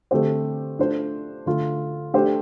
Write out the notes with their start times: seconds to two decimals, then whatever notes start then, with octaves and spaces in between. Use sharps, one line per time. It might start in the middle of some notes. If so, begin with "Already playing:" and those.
0.11 D3 A3 C4 G4 C5
0.79 A3 D4 F4 C5
1.46 D3 A3 F4
2.14 A3 D4 G4 C5